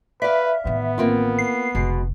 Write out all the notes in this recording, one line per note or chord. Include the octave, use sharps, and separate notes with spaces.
B4 D5 E5 F5
A1 D#3 B3
A#3 C4 F4
C7
F1 B2 D3 G#3